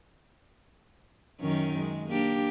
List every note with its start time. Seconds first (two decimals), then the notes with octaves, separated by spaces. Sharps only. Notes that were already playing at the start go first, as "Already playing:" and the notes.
1.40 F#2 D#3 C#4
1.79 G#3
2.09 A#3 D4 G4